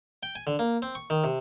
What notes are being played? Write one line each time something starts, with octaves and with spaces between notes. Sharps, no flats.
G5
G#5
D3
A#3
C4
C#6
D#3
C3